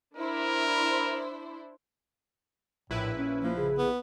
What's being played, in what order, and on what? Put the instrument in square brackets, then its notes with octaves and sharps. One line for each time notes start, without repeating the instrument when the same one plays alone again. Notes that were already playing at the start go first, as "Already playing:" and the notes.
[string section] D4 E4 C5 [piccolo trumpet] A#4
[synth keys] A#1 E4 B4 [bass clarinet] A2
[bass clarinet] C#4
[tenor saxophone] F3 [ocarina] A#3
[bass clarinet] C#3 [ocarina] G#4
[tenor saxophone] B3